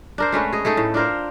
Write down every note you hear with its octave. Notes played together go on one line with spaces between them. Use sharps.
D4 A#4 C5
G#3 A3 C#4 B4
G#4 D#5
A3 D#4 G#4 A4
A2
D4 F4 A#4 C5